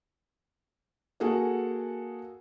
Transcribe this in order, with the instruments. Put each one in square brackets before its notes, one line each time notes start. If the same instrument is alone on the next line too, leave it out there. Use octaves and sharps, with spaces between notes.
[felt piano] A#3 F#4 G#4 A4 F#5